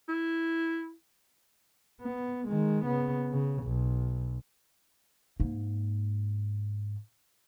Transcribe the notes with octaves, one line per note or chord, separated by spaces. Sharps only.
E4
B3
D#3 G#3
C#3 B3
C#3
B1
G#2 A#3